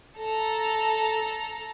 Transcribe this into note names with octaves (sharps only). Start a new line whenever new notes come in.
A4 A#5